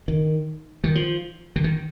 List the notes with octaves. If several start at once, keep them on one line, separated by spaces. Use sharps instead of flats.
D#3
D#3
F3
D3
D#3